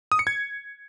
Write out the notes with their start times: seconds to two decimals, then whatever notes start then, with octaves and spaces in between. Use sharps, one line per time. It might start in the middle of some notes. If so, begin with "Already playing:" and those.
0.12 D#6
0.19 C#7
0.27 G#6